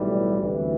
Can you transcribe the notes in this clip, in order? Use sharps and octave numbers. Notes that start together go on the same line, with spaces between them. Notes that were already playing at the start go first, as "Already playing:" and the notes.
Already playing: B1 A2 E3 G3
D2 C3 E3